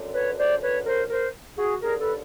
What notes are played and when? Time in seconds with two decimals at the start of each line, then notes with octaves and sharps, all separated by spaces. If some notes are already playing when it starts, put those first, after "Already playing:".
Already playing: F#2 D3
0.14 B4 C#5
0.38 C5 D5
0.62 B4 C#5
0.86 A#4 C5
1.10 A#4 C5
1.58 F#4 G#4
1.82 D#2 D3 G#4 A#4
2.00 A4 B4